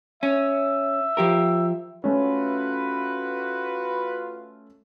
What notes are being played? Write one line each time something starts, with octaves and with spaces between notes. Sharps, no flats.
C#4 E5
F3 G4 A#4
A3 C#4 F4 F#4 B4